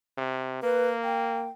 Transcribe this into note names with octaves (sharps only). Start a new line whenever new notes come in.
C3
A#3 B4
G5